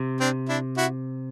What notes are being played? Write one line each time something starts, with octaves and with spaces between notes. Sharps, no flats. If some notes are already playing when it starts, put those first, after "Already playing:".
Already playing: C3
C4 D4
D4 E4
E4 F#4